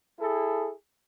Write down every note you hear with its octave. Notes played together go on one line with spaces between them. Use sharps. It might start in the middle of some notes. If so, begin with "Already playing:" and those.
E4 G#4 A4